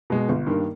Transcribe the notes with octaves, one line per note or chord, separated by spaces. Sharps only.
B2 G#3
G1
G2 D#3 A#3